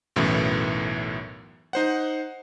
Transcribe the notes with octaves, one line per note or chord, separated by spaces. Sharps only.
B1 F#2 A2 E3
D#4 C5 F#5